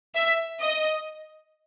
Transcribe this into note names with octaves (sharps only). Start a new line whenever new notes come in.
E5
D#5